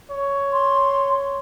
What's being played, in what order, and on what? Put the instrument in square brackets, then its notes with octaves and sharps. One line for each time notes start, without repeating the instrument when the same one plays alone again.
[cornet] C#5
[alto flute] C6